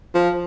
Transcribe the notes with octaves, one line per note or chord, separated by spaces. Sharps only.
F3